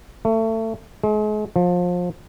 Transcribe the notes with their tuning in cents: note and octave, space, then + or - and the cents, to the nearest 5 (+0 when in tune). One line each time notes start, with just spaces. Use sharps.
A3 +25
G#3 +40
F3 +25